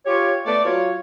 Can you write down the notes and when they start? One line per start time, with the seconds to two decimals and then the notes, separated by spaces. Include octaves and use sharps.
0.06 F4 G4 C#5
0.45 A3 B3 D5
0.64 F#3 F4 C#5